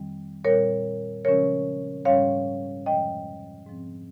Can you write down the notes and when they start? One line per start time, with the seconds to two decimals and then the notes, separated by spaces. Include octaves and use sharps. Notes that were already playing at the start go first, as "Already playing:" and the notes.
Already playing: F2 D#3 G3 C4
0.44 A#2 G3 C4 A#4 C#5
1.25 C#3 F3 G#3 C#4 A#4 C#5
2.05 G#2 G3 C#4 C#5 F5
2.86 F2 C3 F3 G#3 D#5 G5
3.67 G#2 F3 C4